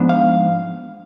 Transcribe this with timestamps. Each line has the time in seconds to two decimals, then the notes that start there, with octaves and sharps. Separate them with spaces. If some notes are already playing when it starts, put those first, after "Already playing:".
Already playing: G#2 F3 B3 D4
0.09 F5